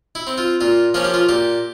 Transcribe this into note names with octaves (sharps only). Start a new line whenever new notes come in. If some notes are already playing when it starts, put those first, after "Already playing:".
E4
C4
F4
A#2 F4
F3 A#3 C#4 F4
G4
F4
A#2 G4